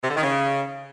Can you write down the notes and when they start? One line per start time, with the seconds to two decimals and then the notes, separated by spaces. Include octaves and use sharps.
0.04 C3
0.10 D3
0.16 D#3
0.23 C#3